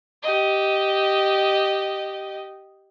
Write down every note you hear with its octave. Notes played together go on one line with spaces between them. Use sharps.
G4 D#5